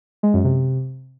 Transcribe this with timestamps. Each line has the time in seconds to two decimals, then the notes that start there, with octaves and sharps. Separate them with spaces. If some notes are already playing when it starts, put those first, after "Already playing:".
0.23 G#3
0.34 F#2
0.44 C3